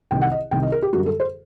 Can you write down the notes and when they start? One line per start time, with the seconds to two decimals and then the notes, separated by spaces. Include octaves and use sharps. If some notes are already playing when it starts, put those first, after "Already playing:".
0.11 C2 C3 D#3 G5
0.21 F#5
0.32 D#5
0.51 C2 C3 D#3 G5
0.63 D#5
0.72 A#4
0.82 G4
0.93 F#2 D3 G3 F#4
1.06 A4
1.20 C5